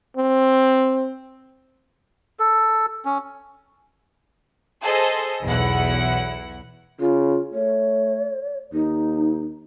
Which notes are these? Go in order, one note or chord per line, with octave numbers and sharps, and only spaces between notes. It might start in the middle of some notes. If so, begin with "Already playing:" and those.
C4
A4
C#4
G#4 A4 C5 D#5
B1 E2 E4 F#5
C#3 F4
A3 C#5
D#2 D#4